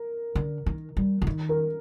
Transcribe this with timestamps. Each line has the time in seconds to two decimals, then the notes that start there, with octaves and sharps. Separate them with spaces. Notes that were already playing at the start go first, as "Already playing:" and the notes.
Already playing: A#4
0.35 D3
0.66 D#3
0.97 G3
1.22 D3
1.27 D#3
1.49 A#4